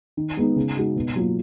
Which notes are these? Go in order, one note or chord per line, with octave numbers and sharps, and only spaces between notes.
D#3
G#3 B3 D#4
C#3
G#3 D#4 F#4
B2
F#3 A#3 F4